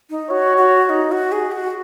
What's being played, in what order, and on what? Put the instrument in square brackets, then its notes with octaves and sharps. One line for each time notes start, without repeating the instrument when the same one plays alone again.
[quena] D#4
[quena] F#4 [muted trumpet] C#5
[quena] F#4
F#4
D#4
F#4
G#4
F#4